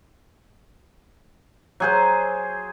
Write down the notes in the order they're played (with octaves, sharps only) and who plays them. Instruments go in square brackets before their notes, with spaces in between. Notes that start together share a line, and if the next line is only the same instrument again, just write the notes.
[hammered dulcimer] F#3 G#4 C5